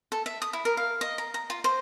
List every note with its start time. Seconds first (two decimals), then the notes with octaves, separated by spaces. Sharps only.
0.12 A4
0.26 E5
0.42 D#6
0.53 E4
0.65 A#4
0.77 F5
1.01 D#5
1.18 A#5
1.34 A#5
1.50 F4
1.64 C5